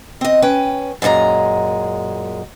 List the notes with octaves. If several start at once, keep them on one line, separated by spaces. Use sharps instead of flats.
C4 D#5
C#4 B4 G5
F#2 A#2 G#3 A4 A#5